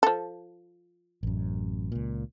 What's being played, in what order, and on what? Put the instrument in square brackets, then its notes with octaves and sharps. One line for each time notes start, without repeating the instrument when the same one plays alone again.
[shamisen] F3 A4
[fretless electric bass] A1 F#2
C#2 A#2